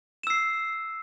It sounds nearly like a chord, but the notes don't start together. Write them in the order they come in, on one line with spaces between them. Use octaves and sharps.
E7 E6 C7